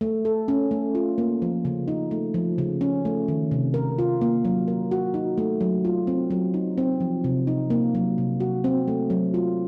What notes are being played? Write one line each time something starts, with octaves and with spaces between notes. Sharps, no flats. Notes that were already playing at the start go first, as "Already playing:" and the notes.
A3
A4
C#4
A3
F4
A#3
F3
C#3
D#4
A3
F3
C#3
C#4
A3
D#3
C3
A#4
F4
A#3
F#3
A#4
F#4
D#4
A3
F#3
F4
C4
F#3
D#4
C4
F3
C3
D#4
A#3
F#3
C3
F#4
C4
A3
F#3
F4